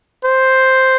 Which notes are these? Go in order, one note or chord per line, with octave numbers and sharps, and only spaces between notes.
C5